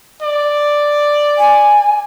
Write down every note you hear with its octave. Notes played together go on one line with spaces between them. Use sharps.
D5
G#5